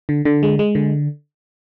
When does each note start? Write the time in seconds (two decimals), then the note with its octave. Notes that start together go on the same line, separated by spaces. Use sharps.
0.09 D3
0.25 D3
0.43 G#3
0.59 G#3
0.75 D3